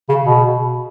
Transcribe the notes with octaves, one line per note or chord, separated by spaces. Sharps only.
C#3
B2